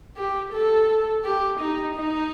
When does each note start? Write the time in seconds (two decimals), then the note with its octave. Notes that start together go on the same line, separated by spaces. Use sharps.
0.17 G4
0.53 A4
1.25 G4
1.60 D#4
1.96 D#4